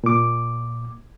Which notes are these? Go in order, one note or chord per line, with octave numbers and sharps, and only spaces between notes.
A#2 D6